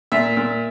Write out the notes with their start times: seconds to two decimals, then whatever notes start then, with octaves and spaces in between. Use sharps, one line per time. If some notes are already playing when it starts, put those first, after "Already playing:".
0.12 A#2 E5
0.37 A#2